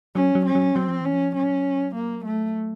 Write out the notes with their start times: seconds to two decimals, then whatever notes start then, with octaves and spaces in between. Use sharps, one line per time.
0.15 F#3 C#4
0.35 F#3
0.45 C#4
0.55 F#3
0.75 F#3 C4
0.88 F3
1.01 E3 C#4
1.13 F3
1.35 F#3 C#4
1.95 A#3
2.24 A3